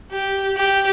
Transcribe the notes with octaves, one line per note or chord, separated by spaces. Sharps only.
G4
G4